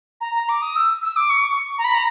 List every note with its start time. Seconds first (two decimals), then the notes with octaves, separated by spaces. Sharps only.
0.21 A#5
0.35 A#5
0.49 D6
0.62 D#6
0.76 E6
1.03 E6
1.16 D6
1.30 C#6
1.78 A#5
1.84 B5
1.95 A#5